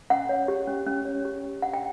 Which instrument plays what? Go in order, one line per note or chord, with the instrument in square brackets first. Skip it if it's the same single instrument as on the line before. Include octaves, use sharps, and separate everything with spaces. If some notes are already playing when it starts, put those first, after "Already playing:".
[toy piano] C#4 F#5
C#5
G4
C#4
C#4
C#5
G4
C#4
D4 F#5
G5